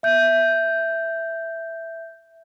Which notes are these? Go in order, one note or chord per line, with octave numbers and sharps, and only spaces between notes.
E5 G6